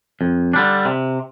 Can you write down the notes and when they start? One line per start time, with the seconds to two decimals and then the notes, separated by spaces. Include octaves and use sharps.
0.21 F2
0.53 D3 G3 D4
0.85 C3